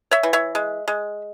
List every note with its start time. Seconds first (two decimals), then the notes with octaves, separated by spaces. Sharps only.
0.11 C#5 E5
0.23 E3
0.33 C#5 E5
0.55 G#3
0.88 G#3